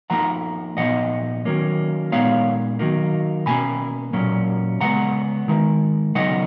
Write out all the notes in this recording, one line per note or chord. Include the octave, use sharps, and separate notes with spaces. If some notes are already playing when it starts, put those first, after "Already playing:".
F3 A#3 D#4 F#5 A#5
A#2 F3 B3 D#4 D#5 F#5
D#3 F#3 A#3 C#4
A#2 G#3 B3 D#4 C#5 F5
D#3 F#3 A#3 D#4
B2 A#3 C#4 G#5 B5
A#2 F#3 A#3 C#4
C#3 G#3 B3 F#5 A#5
D#3 G#3 D#4
C#3 F#3 B3 D#4 D#5 F#5